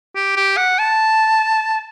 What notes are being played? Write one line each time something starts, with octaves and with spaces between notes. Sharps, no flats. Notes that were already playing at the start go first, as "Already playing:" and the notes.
G4
G4
F#5
A5